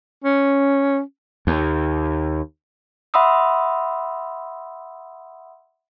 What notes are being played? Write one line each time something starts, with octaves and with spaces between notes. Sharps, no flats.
C#4
D#2
E5 F#5 B5 C6 D#6 E6